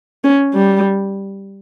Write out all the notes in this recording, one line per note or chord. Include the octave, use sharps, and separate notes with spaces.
C#4
G3